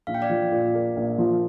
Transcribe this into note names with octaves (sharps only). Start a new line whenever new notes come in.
A#1 F5
G5
D5 F5
F3
A#2
A#3
A#1
F3